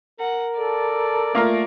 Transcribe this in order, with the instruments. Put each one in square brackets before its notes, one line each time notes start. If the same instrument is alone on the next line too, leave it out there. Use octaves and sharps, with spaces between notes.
[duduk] A#4 [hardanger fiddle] F#5
[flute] A4 [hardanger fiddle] D5
[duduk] A3 [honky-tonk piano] A#3 F4 A#4